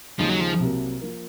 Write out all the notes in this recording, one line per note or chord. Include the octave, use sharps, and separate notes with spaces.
D#2 C#3 F3 G#3 D#4 G#4
F#3
F3
C2 C3 F#3 A#3
F3 A#3